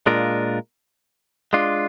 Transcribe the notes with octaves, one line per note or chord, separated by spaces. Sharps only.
A#2 G#3 D4 F4 A#4
G#3 D4 F4